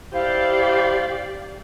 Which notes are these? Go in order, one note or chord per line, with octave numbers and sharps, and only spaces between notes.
E4 G4 C5 D5 F5